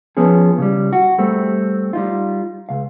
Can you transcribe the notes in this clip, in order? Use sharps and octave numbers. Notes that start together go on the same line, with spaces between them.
F3 B3 C#4 G#4
C#3 G3
F#4
G3 A3 C4
G3 D#4 F4
C#2 F5